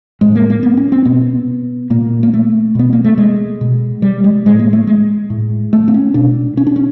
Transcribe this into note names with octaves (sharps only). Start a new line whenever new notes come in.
A2 G#3
A#3
A#3
B3
C#4
C4
B2 B3
A#2 A#3
A#3
A3
B2 B3
A#3
A3
G#3
B2
G3
G#3
A2 G#3
A#3
A3
G#3
A2
A3
C4
C#4
B2 D4
C#4
D4
C#4